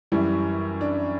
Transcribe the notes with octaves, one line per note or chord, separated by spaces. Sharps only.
F#2 E3 G3 E4
D4